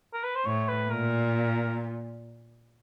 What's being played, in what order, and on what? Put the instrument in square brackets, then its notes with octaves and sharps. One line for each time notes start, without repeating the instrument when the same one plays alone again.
[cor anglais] A#4
B4
C5
[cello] A2 [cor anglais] C#5
[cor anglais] B4
[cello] A#2 [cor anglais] A#4